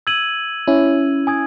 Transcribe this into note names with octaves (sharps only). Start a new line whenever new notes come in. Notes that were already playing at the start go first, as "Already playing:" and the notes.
E6 G#6 D#7 F#7
C#4 E4
G#5 D#6 G#6